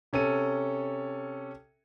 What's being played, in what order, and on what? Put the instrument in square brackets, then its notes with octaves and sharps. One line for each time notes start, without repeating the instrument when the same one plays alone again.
[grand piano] C3 C#4 A4 D#7